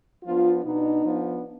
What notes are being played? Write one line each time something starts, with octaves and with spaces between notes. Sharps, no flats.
F3 B3 D4 F4
B2 B3 D4 D#4
F3 B3 D4